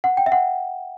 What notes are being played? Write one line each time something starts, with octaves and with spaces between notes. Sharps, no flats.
F#5
G5
E5
F#5